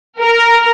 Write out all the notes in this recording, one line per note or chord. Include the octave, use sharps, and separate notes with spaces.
A#4